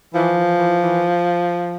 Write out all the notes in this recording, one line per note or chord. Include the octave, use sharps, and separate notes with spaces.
E3 F3
E3
E3
E3